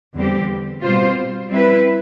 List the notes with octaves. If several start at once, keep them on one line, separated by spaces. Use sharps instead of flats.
E2 D3 G3 C4 G4
B2 G3 C4 F4 C5
G3 C4 E4 B4